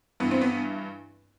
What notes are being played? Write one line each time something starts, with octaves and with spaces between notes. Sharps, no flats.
G2 E3 B3
C4
B3